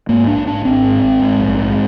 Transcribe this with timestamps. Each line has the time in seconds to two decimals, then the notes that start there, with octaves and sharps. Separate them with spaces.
0.09 G#2 A#3
0.27 A#1 D4
0.47 G#2 D4
0.65 G#1 C4
0.84 G#2
1.03 G#1
1.21 G#2
1.40 A#1
1.58 G#2